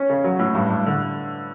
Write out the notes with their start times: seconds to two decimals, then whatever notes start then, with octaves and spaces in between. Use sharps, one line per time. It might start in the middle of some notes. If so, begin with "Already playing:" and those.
Already playing: C#4
0.10 C#3
0.24 F#3
0.39 A2
0.55 G2
0.70 G2
0.86 D3